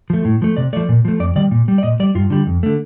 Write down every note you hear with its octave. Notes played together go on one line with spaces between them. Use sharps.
F3 A3
A2
F3 A3
C3 D5
F3 A3 D5
A#2
F3 A3
F2 D5
D#3 G3 D5
A#2
G3
D5
A#2 D#5
G3 D5
G2 F4
D3 G3
F2
D3 A3